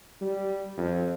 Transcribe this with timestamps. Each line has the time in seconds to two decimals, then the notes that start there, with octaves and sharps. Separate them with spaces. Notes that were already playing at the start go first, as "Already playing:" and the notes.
0.21 G3
0.77 F2